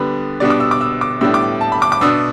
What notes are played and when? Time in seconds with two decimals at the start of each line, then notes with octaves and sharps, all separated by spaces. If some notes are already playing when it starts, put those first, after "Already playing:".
Already playing: D3 G3 B3 D4 B4
0.40 B2 G3 B3 D4 D5
0.50 D6
0.60 E6
0.71 D6
0.81 E6
1.01 D6
1.21 A2 G3 B3 D4 E6
1.34 D6
1.61 A5
1.72 B5
1.82 D6
1.92 D6
2.01 B2 B3 D4 E6